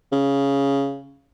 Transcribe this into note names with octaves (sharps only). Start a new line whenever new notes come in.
C#3